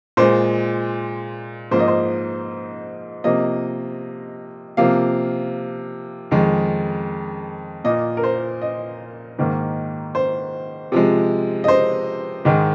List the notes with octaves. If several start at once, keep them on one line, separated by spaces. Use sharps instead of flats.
A#2 G#3 C5
G#2 F3 A#3 C5
D#5
C5
C3 F3 A#3 D#5
C3 F3 A#3 F5
F2 D#3 G#3
A#2 A#3 D#5
A#4
C5
D#5
G#2 D#3 A#3
C5
C3 F3 G#3
D#5
C5
G#2 D#3 G#3